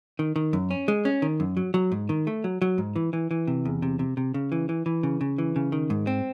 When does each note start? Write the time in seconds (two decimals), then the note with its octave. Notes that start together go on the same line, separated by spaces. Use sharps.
0.19 D#3
0.36 D#3
0.53 F#2
0.71 C#4
0.88 G#3
1.05 C#4
1.22 D#3
1.40 F#2
1.57 F#3
1.74 F#3
1.92 G#2
2.09 D#3
2.27 A3
2.44 F#3
2.62 F#3
2.78 G#2
2.96 E3
3.13 E3
3.31 E3
3.47 C3
3.65 E2
3.82 C3
3.99 C3
4.17 C3
4.34 C#3
4.52 E3
4.69 E3
4.86 E3
5.03 C#3
5.21 C#3
5.38 E3
5.56 C#3
5.72 D#3
5.90 G#2
6.07 C4